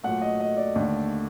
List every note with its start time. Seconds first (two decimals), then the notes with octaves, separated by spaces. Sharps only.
0.03 A#2 F#3 A3 F#5
0.21 D#5
0.40 D#5
0.57 D5
0.75 D#2 D3 A3